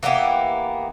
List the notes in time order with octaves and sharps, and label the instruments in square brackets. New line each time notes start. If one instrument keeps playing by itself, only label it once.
[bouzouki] E3 A#3 B3 G4